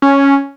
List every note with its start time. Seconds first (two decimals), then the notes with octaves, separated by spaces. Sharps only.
0.02 C#4